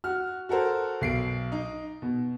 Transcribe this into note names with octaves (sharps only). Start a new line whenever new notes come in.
F#4 F6
F#4 A4 A#4 C5
B1 C7 D7
D#4
B2